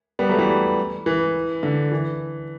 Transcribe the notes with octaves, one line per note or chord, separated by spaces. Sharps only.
G3 B3
F#3 A3
E3 G3
E3
D3
E3